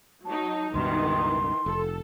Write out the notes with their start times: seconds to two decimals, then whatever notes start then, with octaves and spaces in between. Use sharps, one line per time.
0.25 F#3 D#4 A5
0.74 C#2 G2 B2 D#3 E3 C6
1.66 F1 A4